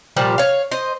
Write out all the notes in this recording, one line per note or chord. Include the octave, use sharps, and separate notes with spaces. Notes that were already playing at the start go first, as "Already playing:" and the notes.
A#2 F3 G3
C#5 F5
C5 D#5